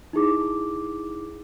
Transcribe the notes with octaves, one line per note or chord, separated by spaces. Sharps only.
D#4 E4 G#4 D6